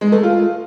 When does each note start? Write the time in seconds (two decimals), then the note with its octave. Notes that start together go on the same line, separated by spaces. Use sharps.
0.01 G#3
0.12 A3
0.23 F4